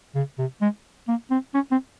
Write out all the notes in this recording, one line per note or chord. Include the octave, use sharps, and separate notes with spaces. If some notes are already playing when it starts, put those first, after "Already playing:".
C#3
C3
G#3
A#3
C4
C#4
C4